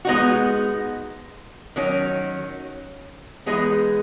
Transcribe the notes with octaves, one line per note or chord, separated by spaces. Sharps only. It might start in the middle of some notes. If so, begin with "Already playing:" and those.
G#3 B3 D#4 F#4
D#3 F#3 C#4
E3 G#3 B3 D#4 G#4